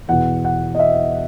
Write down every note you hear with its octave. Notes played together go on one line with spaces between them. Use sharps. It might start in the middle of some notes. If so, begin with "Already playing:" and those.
E2 B2 F#5
F#5
D#5
E5